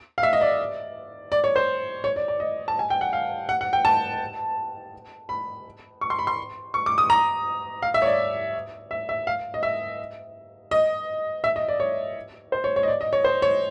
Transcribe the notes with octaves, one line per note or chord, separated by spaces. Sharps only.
F5
E5
D#5
D5
D5
C#5
C5
C#5
D5
D5
D#5
A5
G#5
G5
F#5
F5
F#5
F#5
G5
A5
B5
C#6
C6
B5
C6
C#6
D6
D#6
A#5
F5
E5
C#5
D5
E5
E5
F5
D#5
E5
D#5
E5
D#5
D5
C#5
C5
C#5
C#5
D#5
D5
D#5
C#5
C5
C#5